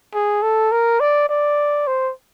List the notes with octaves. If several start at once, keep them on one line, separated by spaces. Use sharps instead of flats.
G#4
A4
A#4
D5
D5
C5